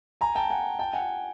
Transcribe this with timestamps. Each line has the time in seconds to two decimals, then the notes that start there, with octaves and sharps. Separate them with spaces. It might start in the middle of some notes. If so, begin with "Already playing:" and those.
0.21 G#5 A#5
0.35 G5 A5
0.50 F#5 G#5
0.79 G5 A5
0.93 F#5 G#5